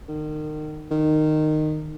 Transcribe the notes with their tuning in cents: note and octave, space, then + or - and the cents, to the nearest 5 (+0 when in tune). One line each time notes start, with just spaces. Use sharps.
D#3 -30
D#3 -15